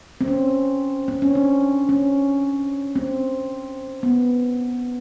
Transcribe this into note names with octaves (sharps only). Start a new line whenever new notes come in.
C4
C#4
C4
C#4
D4
C#4
C4
B3